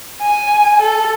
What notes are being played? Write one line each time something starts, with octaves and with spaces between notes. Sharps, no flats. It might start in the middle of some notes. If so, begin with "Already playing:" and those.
G#5
A4